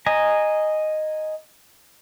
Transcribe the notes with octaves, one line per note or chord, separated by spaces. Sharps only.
D#5 G#5 A#5